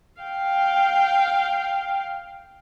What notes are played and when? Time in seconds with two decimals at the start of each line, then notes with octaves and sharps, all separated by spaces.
0.21 F5 G5